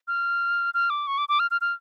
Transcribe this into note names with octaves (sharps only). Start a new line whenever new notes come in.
F6
F6
D6
C#6
D6
D6
F6
F6
F6